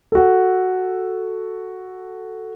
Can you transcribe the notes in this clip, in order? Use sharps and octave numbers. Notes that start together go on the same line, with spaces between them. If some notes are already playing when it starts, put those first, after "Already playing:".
F#4 A4